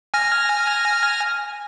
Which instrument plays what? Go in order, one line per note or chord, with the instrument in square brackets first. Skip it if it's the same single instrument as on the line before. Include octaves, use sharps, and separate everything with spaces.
[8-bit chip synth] G#5 F6 A#6